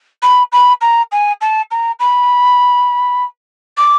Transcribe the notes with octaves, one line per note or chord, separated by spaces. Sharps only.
B5
B5
A#5
G#5
A5
A#5
B5
D6